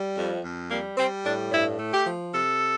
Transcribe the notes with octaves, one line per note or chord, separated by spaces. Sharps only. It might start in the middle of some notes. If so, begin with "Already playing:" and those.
Already playing: G3
F2
F2
G3 A#3
G3 C4
A2 D4
G2 E4
A3
G4
F3
C3 A4